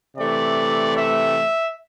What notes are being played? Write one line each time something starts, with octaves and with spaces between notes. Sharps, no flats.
C3 E3 A3 D5
E5